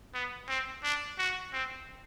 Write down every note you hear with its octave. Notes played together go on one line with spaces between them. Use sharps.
B3
C4
D4
F#4
C4